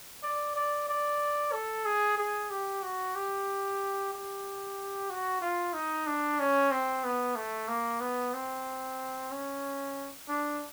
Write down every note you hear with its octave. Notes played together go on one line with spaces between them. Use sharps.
D5
D5
D5
A4
G#4
G#4
G4
F#4
G4
G4
F#4
F4
D#4
D4
C#4
C4
B3
A3
A#3
B3
C4
C#4
D4